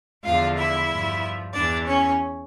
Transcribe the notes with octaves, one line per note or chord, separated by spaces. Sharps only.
E2 D3 F3 F4 F5
E4 E5
G2 F3
E2 E3 D4 D5
C#4 C#5